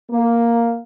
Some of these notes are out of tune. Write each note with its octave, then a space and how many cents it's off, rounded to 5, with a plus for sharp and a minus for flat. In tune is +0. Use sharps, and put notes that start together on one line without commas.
A#3 +0